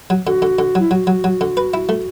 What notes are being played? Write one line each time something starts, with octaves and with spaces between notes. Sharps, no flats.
F#3
D3 F#4
D3
D3
F#3 E4
F#3 F#4
F#3
F#3
D3
B4
E4
A3